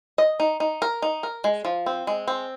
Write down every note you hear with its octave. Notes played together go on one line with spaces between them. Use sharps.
D#5
D#4
D#4
A#4
D#4
A#4
G#3
F3
C4
G#3
C4